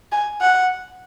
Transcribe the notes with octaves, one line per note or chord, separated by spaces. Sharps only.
G#5
F#5